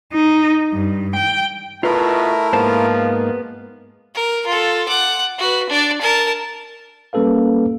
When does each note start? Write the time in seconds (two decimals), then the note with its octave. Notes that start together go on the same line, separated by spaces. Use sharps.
0.12 D#4
0.73 G2
1.16 G5
1.83 B2 A3 E4 F4 A#4 B4 E5 F5
2.53 G#2 F3 A#3 B3 C5 A5
4.15 A#4
4.47 F4 A4
4.89 F#5 D6
5.39 F#4 B4
5.70 D4 D5
6.01 A#4 A5
7.13 G3 A#3 C#4 A4 B4 F5